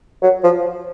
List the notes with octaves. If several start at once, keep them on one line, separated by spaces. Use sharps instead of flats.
F#3
F3